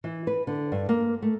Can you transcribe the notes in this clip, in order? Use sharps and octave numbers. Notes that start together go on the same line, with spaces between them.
E3
B4
D3
G2
A#3
A3